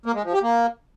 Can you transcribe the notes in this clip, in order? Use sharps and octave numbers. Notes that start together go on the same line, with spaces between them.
A#3
G#3
F3
G4
A#3